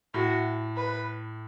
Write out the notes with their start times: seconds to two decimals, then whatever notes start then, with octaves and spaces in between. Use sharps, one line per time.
0.14 A2 F#4
0.77 B4